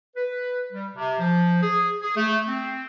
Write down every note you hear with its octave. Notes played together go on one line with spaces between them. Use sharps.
B4
G3
C3
F3
G#4
G#4
A3
C4